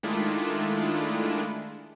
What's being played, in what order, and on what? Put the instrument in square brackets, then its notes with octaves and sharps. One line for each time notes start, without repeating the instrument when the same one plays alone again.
[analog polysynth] D#3 G#3 A3 D4 E4 F4